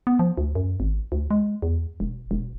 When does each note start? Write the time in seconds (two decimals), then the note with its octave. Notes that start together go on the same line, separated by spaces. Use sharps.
0.07 B3
0.19 F3
0.38 D2
0.55 F#2
0.80 G#1
1.12 D2
1.31 G#3
1.62 E2
2.00 E1
2.31 E1